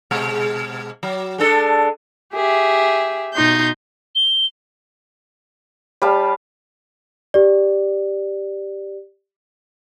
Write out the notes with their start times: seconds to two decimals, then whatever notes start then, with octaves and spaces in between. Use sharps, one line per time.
0.11 B2 G#3
1.03 F#3
1.38 G#3 D4 A4
2.32 G4 G#4 E5
3.34 B2 D#4 C6 G6
4.15 G7
6.02 G3 C#5 F5 A5 B5
7.34 G4 D5